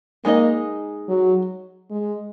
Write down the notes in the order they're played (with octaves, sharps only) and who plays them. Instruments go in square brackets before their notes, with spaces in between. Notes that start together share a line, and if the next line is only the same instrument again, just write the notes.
[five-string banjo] G#3 D#4 G#4 D#5 [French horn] A#3
[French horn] F#3
G#3